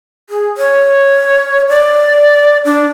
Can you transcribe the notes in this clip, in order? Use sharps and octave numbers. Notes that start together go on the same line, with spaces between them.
G#4
C#5
D5
D4